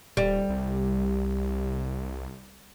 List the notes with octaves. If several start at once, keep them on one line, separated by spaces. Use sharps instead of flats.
D#1 G3
C2